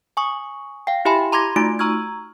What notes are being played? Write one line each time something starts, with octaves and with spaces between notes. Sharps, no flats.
G#5 C#6 D#6
F5 G5
E4 G4 E5 G#5 B5
A#5 C6 D6 G#6 A#6
A3 D#4 F4 F#4 D7
A#5 C#6 E6 F6 G#6